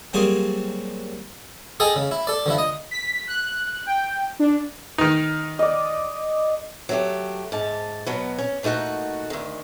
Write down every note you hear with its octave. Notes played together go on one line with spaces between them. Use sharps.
F#3 G3 A#3 C4 G#4 F#5
G#4 A4 D#5 G5 A#5
C#3
E4
A4 D5
D3 F3 E4
D#5
B6
F#6
G5
D4
D#3 D#4
D5 D#5
F#3 A3 G4
G#2 A5
B2 F#3 B3
C#4
A#2 A3 D#4 F#4 F#5
D2 D#3